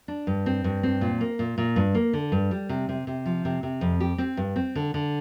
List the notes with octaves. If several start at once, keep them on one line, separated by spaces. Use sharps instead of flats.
D4
G2
C4
G2
C4
A#2
A#3
A#2
A#2
G2
A#3
D3
G2
G3
C3
C3
C3
F3
C3
C3
F2
G4
C4
G2
C4
D3
D3